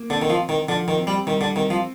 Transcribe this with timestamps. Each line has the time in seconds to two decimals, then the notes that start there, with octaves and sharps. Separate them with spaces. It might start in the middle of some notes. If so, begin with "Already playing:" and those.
Already playing: A#3
0.10 D3 C4
0.22 D#3
0.30 F3
0.38 C4
0.49 D#3
0.69 D3 F3
0.88 D#3
0.98 C4
1.07 G3
1.27 D#3 G3
1.41 D3
1.56 D#3 C4
1.70 F3